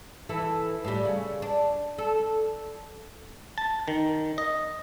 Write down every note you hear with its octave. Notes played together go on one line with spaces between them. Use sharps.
E3 E4 A4
A2 G3
C#3
D4
A4
A5
D#3
D#5